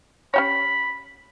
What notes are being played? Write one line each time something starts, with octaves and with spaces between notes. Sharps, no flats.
C#4 G4 C#5 B5